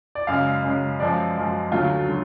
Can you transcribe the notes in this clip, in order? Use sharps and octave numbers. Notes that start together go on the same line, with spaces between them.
D5
F#2 C#3 G#3 F5
F#2 C#3 G#3
F#2 F3 G#3 D5
F#2 F3 G#3
D2 D3 F#3 A3 F4
D3 F#3